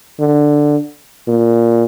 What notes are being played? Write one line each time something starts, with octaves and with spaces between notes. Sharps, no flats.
D3
A#2